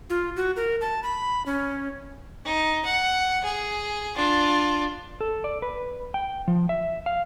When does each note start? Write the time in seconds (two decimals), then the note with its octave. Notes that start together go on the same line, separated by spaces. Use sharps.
0.10 F4
0.36 F#4
0.56 A#4
0.81 A5
1.03 B5
1.46 C#4
2.45 D#4
2.85 F#5
3.44 G#4
4.16 D4 F4
5.21 A4
5.44 D5
5.62 B4
6.14 G5
6.48 F3
6.69 E5
7.06 F5